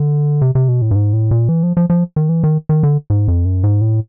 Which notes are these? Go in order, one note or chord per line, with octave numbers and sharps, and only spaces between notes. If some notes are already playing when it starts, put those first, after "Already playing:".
Already playing: D3
C3
C3
B2
A2
G2
G#2
A2
A#2
E3
F3
F3
F3
D#3
E3
D#3
D#3
D3
G#2
F2
F#2
G#2
A2